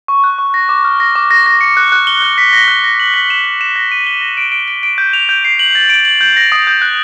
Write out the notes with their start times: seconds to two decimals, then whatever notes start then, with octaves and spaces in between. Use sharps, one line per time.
0.08 C#6
0.24 F#6
0.39 C#6
0.54 A#6
0.69 D6
0.84 F6
1.00 A#6
1.16 D6
1.31 A#6
1.46 A#6
1.61 C#7
1.77 F#6
1.92 F#6
2.07 G7
2.22 F#6
2.38 B6
2.53 A#6
2.68 F#6
2.84 A#6
3.00 F#7
3.14 B6
3.30 E7
3.45 E7
3.61 E7
3.76 A#6
3.91 D#7
4.06 G7
4.21 A#6
4.37 D7
4.52 D7
4.68 D7
4.83 D7
4.98 G6
5.13 F7
5.29 G6
5.45 C7
5.59 F#7
5.75 A6
5.90 D7
6.05 F#7
6.21 G6
6.37 A#6
6.52 D#6
6.67 G6
6.82 F#6